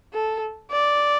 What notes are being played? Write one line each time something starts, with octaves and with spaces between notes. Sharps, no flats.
A4
D5